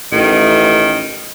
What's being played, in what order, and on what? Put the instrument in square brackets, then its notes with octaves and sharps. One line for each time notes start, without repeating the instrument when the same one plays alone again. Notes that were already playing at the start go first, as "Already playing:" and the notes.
[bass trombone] A1 [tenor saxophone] D#3